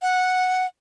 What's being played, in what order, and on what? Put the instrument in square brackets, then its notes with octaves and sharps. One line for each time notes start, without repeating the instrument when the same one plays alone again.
[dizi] F#5